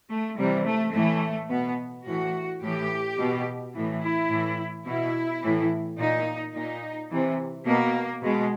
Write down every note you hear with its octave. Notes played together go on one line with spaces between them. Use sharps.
A3
C3 E3 G3
A3
A2 E3 A3
B2 B3
A2 E3 F#4
A2 E3 G4
B2
A2 E3
E4
A2 E3
B2 E4
A2 E3
A#2 D#4
A#2 D#4
C3 E3
B2 A#3
B2 G#3